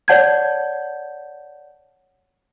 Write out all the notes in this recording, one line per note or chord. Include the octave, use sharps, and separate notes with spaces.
C#5 D5 F#5 A5 G6 G#6